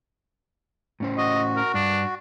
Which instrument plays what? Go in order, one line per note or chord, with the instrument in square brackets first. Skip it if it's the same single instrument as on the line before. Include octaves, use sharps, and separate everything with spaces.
[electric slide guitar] A2 C#4 C5
[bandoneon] F#4 [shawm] D#5
[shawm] A#4
[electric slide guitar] G2 [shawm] D4